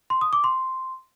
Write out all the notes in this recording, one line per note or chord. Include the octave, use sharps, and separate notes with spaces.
C6
D#6
D6
C6